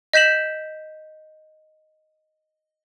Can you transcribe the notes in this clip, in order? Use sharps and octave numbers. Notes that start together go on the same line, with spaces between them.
D#5 G6 B6 E7 F#7